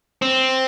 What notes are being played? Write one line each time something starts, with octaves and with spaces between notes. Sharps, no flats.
C4